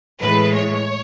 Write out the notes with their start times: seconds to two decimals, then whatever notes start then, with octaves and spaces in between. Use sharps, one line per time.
0.21 A2 E3 G#3 B4
0.53 C#5